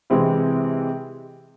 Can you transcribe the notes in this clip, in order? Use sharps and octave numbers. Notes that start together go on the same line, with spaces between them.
C3 E3 G#3 C4 E4